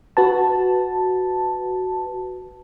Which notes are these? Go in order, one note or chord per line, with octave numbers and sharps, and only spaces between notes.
F#4 B4 A5